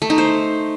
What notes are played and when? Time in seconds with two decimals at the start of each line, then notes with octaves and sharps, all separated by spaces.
0.02 A3
0.10 D#4
0.18 C5